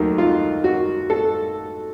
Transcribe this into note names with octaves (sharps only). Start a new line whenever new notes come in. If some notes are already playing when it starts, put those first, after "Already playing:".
Already playing: D#2 D#3 F#3 A3 D#4
F4
F#4
A4